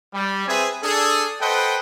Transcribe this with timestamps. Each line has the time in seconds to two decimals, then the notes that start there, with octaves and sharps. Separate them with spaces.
0.14 G3
0.48 C4 G#4 B4 E5 G#5
0.83 D4 G#4 A4
1.41 A4 B4 C5 D#5 F#5 G5